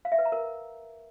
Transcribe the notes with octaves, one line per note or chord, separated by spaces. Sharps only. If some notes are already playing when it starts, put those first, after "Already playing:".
F5
E5
B4
A#5
A#4